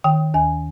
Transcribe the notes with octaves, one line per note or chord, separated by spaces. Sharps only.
D#3 G5
D#2 G#5